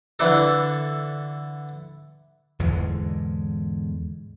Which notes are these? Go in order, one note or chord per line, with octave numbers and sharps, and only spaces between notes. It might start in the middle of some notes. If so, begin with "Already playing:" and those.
D3 E3 D4 A4
E2 G#2 D3 G#3